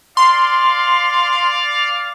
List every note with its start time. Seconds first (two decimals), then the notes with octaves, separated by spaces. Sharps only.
0.17 D5 F5 C6